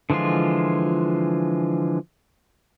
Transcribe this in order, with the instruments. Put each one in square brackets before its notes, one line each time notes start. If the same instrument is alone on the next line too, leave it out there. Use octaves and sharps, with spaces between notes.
[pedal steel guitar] D3 E3 F3 G#3 F4